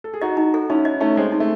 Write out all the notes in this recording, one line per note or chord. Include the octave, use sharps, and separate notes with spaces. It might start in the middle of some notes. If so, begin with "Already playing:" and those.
A4
G#4
D#4 F#4 D#5
D#4
A4
C#4 D#4 E4
D#5
A3 C#4 D#4
G#3 C4 A4
D#4
A3